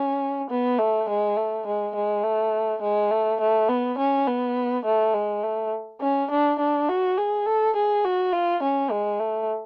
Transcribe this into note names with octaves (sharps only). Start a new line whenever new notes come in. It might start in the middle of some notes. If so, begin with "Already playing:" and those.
Already playing: C#4
B3
A3
G#3
A3
G#3
G#3
A3
G#3
A3
A3
B3
C#4
B3
A3
G#3
A3
C#4
D4
D4
F#4
G#4
A4
G#4
F#4
F4
C#4
G#3
A3